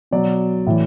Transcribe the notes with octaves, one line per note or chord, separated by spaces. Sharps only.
B2 F#3 D5
A2 E3